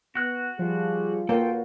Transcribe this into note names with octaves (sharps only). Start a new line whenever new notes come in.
B3 F#4 F#6
F3 G3 G#4
A#3 F4 F#4 A4 B4 C#5 G5